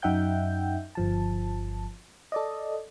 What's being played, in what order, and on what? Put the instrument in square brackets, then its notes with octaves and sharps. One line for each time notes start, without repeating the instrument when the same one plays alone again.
[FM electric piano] F#2 D#4 E5 F#5 G5 G6
G1 F3 A5
A4 D5 D#5